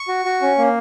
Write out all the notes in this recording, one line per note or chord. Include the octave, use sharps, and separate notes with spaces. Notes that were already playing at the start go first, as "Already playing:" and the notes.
Already playing: C#6
F#4
F#4
C#4
A#3